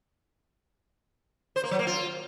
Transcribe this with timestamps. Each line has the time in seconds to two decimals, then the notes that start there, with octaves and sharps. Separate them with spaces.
1.56 C5
1.64 A#3
1.71 F#3
1.79 A#3
1.87 F4